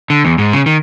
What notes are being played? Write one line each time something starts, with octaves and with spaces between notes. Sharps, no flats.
D3
E2
G#2
C#3
D#3